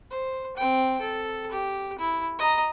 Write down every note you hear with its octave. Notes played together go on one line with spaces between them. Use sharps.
C5
C4 G5
A4
G4
E4
D#5 A#5